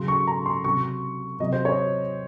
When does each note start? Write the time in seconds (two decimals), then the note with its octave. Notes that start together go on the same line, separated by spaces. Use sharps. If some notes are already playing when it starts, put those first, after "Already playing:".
Already playing: C#3 F#3 C6
0.08 C#6
0.27 A#5
0.46 C6
0.64 C3 F#3 C#6
1.39 C3 F#3 D#5
1.53 C5
1.65 C#5